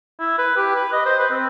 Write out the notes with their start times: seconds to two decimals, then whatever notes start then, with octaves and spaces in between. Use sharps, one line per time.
0.20 E4
0.38 B4
0.57 G4
0.76 B4
0.93 D#5
1.06 C5
1.19 B4
1.31 C4